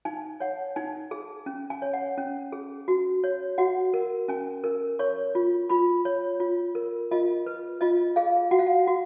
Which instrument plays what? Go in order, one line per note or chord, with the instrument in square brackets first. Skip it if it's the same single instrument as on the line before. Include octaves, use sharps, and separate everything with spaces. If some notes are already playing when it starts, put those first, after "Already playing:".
[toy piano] D#4 G#5
C#5 F#5
D#4 G#5
G#4
C#4
G#5
C#5
F#5
C#4
G#4
F#4
C#5
F#4 F#5
A#4
C#4 G#5
A#4
C#5 C#6
F4
F4 B5
C#5
F4
A#4
F4 D#5
B4
F4 D#5
G#4 F5
F#4 F#5
F5
F#5
F#4